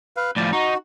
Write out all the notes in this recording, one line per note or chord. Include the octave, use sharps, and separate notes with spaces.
B4 F5
A2 F3 D5
D#4 F#4